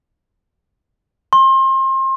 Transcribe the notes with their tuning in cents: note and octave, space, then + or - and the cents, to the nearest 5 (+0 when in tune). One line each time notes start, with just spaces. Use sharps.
C6 +30